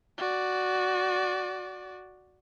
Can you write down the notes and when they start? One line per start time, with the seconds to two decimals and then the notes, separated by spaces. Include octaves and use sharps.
0.18 F#4 D5